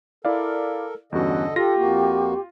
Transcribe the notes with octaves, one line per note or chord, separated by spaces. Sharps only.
E4 A4 A#4 D5 F5
E2 G2 D3 C#4 F#4 A4 D#5
F4 G4 A4 A#6
F2 A#3 F#4